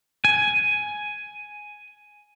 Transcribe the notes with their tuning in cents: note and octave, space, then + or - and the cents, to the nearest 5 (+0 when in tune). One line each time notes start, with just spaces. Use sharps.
G#5 +5